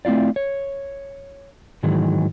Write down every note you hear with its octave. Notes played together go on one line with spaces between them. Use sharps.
A3 C4 E4 F4 D5
C#5
G#2 D#3 E3 F#3 G#3